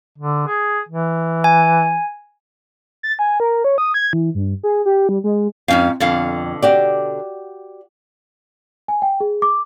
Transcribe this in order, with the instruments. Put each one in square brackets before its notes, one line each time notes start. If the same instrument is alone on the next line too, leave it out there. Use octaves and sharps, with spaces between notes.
[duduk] D3
G#4
E3
[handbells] G#5
[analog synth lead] A6
G#5
A#4
C#5
D#6
G#6
E3
G2
G#4
G4
G3
G#3
[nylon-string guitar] F2 [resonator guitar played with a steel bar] G#2 C#4 F5
[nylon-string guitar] F2 [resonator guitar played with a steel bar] B2 D3 F5
[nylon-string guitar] F#4 G4 D5
[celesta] G#5
G5
G#4
D6